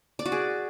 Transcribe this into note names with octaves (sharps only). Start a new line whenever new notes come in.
D5
F#4
G#4